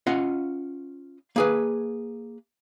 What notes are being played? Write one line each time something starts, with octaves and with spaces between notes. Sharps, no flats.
C#4 F4 D#5 F5 F#5
A#3 G#4 B4